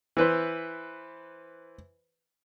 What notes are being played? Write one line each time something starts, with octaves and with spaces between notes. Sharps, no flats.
E3 B4 C5